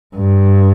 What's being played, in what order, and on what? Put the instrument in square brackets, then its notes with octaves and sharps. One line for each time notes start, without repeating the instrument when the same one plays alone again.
[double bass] G2